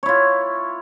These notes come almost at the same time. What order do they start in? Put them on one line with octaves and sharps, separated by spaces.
C#5 E4 F4